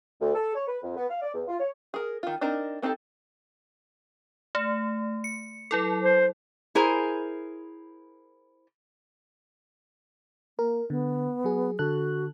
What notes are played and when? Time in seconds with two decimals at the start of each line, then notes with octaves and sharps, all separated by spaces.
0.20 D2
0.34 A4
0.54 C#5
0.67 B4
0.82 F2
0.96 B3
1.09 F5
1.21 D5
1.33 E2
1.48 F4
1.59 C#5
1.94 G#4 A#4
2.23 D#3 F4
2.41 C4 D4 D#4 A#4 A#5
2.82 B3 C4 D#4 G4 A4
4.55 A3
5.24 C#7
5.71 F#3 E4 A4
6.02 C5
6.75 E4 G#4 A#4 C5 G#5
10.59 A#3 A#4
10.90 D3 B3
11.44 F#3 G#4
11.79 D3 F#4 A4 F#6